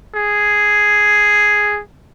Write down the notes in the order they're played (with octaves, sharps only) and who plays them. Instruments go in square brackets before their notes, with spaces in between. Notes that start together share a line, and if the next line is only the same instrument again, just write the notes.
[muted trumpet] G#4